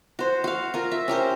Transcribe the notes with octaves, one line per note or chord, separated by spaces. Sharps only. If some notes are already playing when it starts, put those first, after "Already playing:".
F#4 C5
F#4 F5
F4 A#4
E5
C#4 G4 A#4 C5